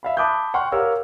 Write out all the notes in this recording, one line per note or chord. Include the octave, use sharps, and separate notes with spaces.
E5 F5 B5
A5 B5 D6 D#6 F#6 G6
F#5 G5 C6 C#6 F6
G4 A#4 C#5 F5 E6